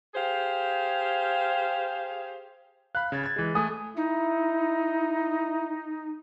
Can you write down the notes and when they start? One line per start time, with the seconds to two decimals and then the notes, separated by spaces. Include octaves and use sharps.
0.15 G4 G#4 C5 F5
2.95 F5 B5 F#6
3.12 C#3 G#6 A6
3.24 G#6 A6
3.36 E3 G#3
3.55 A3 G#5 D#6
3.97 D#4 E4